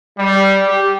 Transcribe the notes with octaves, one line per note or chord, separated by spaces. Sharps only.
G3
G4